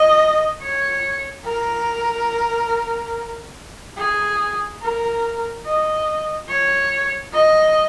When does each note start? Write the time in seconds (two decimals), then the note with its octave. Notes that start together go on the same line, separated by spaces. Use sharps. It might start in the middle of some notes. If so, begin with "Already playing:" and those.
Already playing: D#5
0.61 C#5
1.46 A#4
3.97 G#4
4.82 A#4
5.66 D#5
6.49 C#5
7.33 D#5